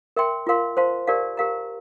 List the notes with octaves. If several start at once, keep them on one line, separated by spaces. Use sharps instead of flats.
A#4 E5 G5 C6
F4 A#4 F5 C6
C5 F5 A5 C6
G4 A#4 D5 F5 A5
G4 A#4 F5 A#5